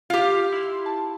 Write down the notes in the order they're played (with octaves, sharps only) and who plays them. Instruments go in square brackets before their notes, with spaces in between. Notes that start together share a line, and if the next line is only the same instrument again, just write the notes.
[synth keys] F4 [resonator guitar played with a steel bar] G4 F5
[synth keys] E4 C6
A5